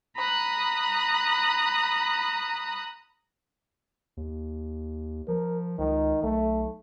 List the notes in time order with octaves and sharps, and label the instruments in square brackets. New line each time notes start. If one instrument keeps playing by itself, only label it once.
[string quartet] A#5 B5 D#6 F#6
[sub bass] D#2
[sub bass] F3 [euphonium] A#4
[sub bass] C#2 [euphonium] D#3
[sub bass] B1 [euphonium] A3